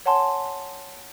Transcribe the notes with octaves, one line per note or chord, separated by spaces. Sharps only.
C#5 F#5 G#5 A5 C6